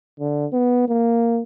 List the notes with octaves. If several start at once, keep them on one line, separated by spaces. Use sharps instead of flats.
D3
B3
A#3